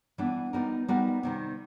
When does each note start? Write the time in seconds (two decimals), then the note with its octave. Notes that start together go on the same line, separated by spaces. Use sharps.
0.18 E3 G3 B3 D4
0.53 G3 B3 D#4 F#4 A#4
0.88 G3 B3 D#4 F#4 A#4
1.23 C3 D#3 G3